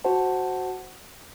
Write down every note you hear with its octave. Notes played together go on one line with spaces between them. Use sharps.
F#4 C5 F#5 A5